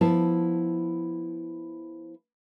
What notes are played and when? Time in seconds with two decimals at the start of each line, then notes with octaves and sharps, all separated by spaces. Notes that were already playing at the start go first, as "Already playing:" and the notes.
0.01 F3 B3 E4 A5